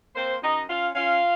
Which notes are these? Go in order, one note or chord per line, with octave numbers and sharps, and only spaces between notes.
A#3 C4 C5
F#2 D#4 D#5
C#4 F4 F5
C#4 F4 F5